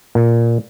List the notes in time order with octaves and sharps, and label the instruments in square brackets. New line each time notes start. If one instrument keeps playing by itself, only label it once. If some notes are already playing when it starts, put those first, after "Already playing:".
[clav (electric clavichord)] A#2